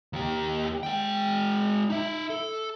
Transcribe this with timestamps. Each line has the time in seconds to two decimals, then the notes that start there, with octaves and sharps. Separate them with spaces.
0.13 D#2 G4
0.83 G#3 G5
1.90 D#4 E5
2.30 A4